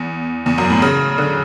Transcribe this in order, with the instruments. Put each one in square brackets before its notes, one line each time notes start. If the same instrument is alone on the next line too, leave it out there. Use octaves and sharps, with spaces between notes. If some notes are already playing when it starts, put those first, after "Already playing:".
Already playing: [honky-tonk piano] E2
E2
F#2
A2
C#3
D3